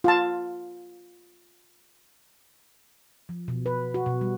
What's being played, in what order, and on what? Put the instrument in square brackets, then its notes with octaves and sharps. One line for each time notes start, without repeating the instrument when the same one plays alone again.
[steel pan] F4 A5
[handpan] F3
B2
B4
F#4
B2
G3